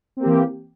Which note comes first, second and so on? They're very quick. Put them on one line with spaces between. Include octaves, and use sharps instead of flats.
C4 A#3 G4 E3